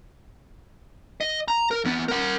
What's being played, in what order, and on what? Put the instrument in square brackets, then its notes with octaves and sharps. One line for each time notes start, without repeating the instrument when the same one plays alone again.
[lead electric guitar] D#5
A#5
A#4
E2 B3
A#4 F#5